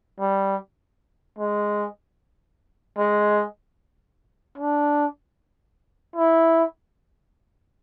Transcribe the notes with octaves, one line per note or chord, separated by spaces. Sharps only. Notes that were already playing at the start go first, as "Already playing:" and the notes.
G3
G#3
G#3
D4
E4